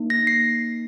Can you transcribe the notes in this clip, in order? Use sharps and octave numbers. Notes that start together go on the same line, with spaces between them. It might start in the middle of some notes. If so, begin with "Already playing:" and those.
Already playing: A#3 D#4
A#6
C7